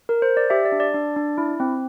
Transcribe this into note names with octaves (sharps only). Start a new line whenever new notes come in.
A#4
C5
D5
G4 E5
D5
D4
D5
D4
D4
E4
C4